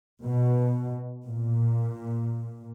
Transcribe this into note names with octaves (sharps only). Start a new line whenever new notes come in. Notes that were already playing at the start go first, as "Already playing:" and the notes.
B2
A#2